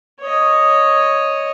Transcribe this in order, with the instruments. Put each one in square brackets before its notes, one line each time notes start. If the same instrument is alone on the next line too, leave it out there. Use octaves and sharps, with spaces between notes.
[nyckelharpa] C#5 D#5